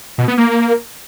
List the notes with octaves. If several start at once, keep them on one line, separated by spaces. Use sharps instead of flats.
B2
B3
A#3